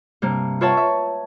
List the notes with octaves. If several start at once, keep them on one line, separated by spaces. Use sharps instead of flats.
G2 C3 A#3
F4 B4 C#5 E5 F#5 A5
E5